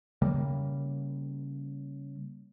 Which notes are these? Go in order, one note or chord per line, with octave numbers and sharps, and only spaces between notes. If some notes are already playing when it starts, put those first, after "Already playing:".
C#3 G3 A#3